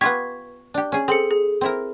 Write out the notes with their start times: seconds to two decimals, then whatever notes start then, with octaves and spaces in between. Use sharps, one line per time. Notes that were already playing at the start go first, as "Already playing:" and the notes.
0.01 B3 F4 G4 C#6 G#6 B6
0.74 D4 G4
0.92 C#4 G#4
1.08 C4 G#4 A4 C#7
1.31 G#4
1.61 C4 E4 A#4